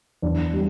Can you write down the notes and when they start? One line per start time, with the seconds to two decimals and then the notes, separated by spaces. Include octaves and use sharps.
0.22 E2 D4
0.53 G3